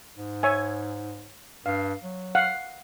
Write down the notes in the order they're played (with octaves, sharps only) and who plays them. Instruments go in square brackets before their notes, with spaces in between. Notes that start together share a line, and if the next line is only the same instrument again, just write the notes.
[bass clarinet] G#2
[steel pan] C#5 E5 G#5
[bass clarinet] G2 [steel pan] F5
[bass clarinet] F#3
[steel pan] F5 F#5